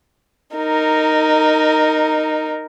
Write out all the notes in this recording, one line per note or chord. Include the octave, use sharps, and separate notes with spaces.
D#4 A#4